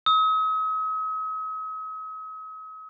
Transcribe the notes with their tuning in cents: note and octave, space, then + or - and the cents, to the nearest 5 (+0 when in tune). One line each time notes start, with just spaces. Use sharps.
D#6 +45